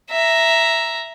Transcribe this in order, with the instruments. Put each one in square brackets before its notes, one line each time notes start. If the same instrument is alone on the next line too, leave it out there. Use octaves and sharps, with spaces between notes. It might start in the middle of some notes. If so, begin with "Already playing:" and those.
[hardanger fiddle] E5 A#5